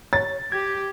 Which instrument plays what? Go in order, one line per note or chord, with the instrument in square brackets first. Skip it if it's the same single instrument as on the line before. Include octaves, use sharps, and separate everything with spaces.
[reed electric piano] C#5 [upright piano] A6
[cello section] G4 [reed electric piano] G#6